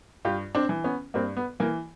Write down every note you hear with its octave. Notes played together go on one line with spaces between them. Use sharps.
G2 F4 G4
C4 D4
E3
B3 C#4
G2 A#3 C4
B3
E3 A#3